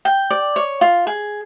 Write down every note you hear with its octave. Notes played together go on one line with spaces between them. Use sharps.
G5
D5
C#5
F4
G#4